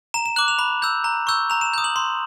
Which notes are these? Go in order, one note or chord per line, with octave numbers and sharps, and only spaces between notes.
A#5 E7
E7
D6 F#6 F#7
F7
B5
E6 G6
A#5
C#6 E6 G6
A#5 F7
E7
D#6 G6
F#7
C6